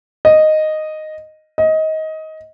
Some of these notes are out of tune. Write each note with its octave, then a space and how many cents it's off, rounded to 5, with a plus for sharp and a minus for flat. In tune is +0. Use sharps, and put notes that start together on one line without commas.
D#5 -5
D#5 +20